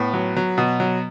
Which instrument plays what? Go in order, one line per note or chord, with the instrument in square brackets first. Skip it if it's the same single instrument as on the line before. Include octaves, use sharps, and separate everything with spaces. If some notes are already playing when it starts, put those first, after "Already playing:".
Already playing: [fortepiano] A2 B3
F#3
F#3
B2
F#3